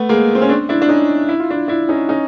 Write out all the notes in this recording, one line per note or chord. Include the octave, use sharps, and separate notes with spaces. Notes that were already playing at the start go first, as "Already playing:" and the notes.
Already playing: A3 B3
G#3 A#3
C4
C#4
C4 D4
D4 E4
D4
C#4 D#4
E4
F4
D4 E4
D4 E4
C#4 D#4
C#4 D#4